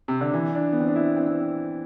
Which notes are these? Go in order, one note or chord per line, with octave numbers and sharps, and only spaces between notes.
C3
D3
E3
D4
B3
C4
D4
E4
C4
C4